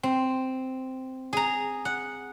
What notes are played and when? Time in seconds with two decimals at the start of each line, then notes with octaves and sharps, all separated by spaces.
0.03 C4
1.33 G#4 A#5
1.85 F#5